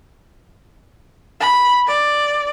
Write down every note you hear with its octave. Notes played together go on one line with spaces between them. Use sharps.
B5
D5